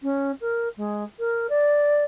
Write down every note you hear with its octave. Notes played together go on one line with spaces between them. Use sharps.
C#4
A#4
G#3
A#4
D5